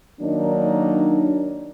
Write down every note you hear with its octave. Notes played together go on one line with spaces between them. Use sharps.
D#3 F#3 A#3 D4 D#4